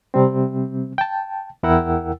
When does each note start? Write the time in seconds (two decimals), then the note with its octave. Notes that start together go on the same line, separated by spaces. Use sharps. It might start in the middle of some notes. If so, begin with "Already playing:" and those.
0.14 C3 G3 C4
0.98 G5 A5
1.63 E2 E4 A#4 F#5 G5 E6